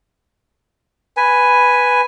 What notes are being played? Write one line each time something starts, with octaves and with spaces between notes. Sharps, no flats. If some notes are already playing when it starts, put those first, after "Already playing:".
B4 G#5